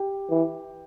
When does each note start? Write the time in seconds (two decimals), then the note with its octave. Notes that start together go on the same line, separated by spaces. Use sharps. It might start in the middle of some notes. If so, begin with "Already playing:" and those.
Already playing: G4
0.30 E3